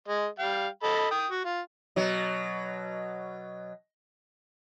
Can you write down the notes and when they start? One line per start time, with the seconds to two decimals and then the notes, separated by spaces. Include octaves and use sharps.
0.08 G#3 D#5
0.39 G3 F5 G5
0.83 A4 D#5 B5
1.11 G5 D#6
1.30 F#4
1.45 F4
1.96 B2 F#3